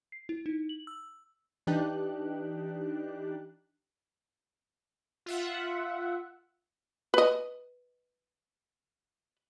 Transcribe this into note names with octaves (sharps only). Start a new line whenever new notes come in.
C7
E4
D#4
F#7
E6
E3 D4 D#4 G4 F#6
F4 E5 F#5
B4 D#5